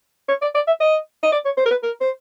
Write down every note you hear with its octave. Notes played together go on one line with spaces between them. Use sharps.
C#5
D5
D5
E5
D#5
D#5
D5
C#5
C5
A#4
B4
A#4
C5